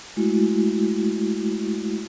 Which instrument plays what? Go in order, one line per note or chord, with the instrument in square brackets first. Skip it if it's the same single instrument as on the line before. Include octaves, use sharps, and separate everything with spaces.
[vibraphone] G#3 A3 E4 F#4